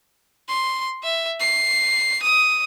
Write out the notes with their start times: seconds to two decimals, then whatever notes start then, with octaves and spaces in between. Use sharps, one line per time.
0.49 C6
1.04 E5
1.40 C7
2.23 D#6